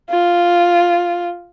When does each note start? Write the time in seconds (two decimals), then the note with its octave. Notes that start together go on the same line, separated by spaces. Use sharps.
0.10 F4